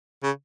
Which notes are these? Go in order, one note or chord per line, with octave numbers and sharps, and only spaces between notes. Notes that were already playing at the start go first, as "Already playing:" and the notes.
C#3